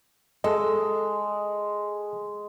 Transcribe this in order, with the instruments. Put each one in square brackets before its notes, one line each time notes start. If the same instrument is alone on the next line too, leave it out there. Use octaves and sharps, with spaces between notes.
[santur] G#3 [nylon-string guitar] A4 [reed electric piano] D#5